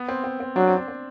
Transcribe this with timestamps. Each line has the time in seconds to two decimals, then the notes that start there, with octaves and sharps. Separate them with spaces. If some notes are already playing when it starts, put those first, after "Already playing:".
Already playing: B3
0.08 C4
0.24 C4
0.40 C4
0.56 F#3 D4
0.67 C4
0.77 D4
0.88 C4